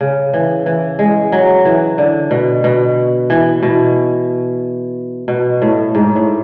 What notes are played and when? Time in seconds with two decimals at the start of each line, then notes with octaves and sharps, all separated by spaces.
0.01 C#3
0.34 E3
0.66 E3
0.99 G#3
1.32 F#3
1.65 E3
1.98 D3
2.31 B2
2.64 B2
3.30 E3
3.63 B2
5.28 B2
5.62 A2
5.95 G#2
6.16 A2